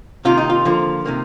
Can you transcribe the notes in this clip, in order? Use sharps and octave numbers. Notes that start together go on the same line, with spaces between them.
C3 D#3 A#3 F4
D#4
F4
D3 F3 A#3
C3 D#3 A#3